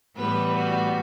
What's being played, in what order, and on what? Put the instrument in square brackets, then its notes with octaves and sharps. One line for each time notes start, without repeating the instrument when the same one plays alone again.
[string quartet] A2 E3 G3 B3 B4
F#4